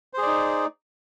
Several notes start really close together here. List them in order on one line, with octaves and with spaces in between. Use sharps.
C5 G#4 D5 D#4